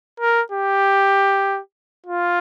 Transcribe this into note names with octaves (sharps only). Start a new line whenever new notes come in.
A#4
G4
F4